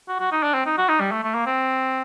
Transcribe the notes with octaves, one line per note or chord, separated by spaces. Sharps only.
F#4
F#4
D#4
D4
C4
D#4
F#4
D#4
G3
A3
A3
A#3
C4